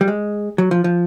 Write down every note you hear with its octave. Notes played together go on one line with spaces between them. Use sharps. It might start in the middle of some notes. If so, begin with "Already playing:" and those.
G3
G#3
F#3
F3
F3